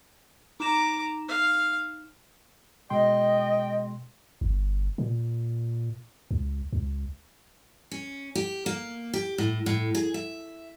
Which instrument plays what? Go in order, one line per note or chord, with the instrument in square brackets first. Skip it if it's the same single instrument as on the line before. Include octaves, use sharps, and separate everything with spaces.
[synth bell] D#4 E7 [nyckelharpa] A#5 D6
[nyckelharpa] F5
[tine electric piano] B2 G#3 C6 [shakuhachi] D#5 [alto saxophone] G5
[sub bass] G1
A#2
C#2
C#2
[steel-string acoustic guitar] C#4
G4
A#3
G4
A2
A2
G#4
E5